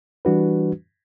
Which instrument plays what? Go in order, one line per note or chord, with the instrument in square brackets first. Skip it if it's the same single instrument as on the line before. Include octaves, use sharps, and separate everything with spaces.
[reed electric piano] E3 G3 D4 F#4 B4